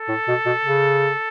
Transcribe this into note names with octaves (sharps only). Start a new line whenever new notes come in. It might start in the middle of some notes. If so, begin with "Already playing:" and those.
Already playing: A4
A2
B2
B2
C#3